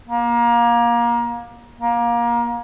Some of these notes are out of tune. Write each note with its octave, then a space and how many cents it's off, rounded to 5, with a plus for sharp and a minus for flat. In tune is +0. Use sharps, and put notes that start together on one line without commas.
A#3 +25
A#3 +25